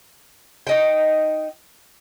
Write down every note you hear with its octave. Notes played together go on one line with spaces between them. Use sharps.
D#4 D#5 G5